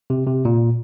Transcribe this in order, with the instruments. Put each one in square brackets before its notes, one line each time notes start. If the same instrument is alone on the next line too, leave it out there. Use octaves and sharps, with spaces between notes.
[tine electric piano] C3
C3
A#2